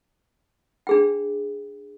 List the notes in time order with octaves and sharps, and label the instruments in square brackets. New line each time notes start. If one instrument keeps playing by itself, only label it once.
[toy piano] D4 G#4 G5